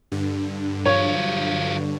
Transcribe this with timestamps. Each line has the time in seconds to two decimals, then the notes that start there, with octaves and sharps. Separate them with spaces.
0.12 G2 D3
0.86 F#3 F4 C#5